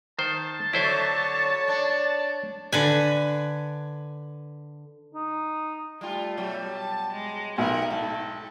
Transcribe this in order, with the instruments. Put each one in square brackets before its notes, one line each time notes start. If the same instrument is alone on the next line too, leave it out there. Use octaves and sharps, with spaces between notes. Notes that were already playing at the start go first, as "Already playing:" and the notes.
[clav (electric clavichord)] D#3 C5 [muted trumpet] A5
[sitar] D3 F#3 [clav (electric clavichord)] E4 C5 E5 [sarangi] C#5
[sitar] D4
[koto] D3 B4 G#5
[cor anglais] D#4
[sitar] G3 F4 [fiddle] A3
[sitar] B2 F#3 G3
[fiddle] A5
G#3
[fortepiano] B1 [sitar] A2 C3 A#4 [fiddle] F#5
[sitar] G#2 [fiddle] A4